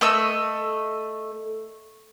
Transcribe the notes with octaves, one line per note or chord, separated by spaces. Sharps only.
A3 D#5 E6